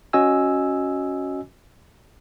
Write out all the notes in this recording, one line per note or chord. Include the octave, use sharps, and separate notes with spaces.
C#4 F#4 D#5 G#5 E6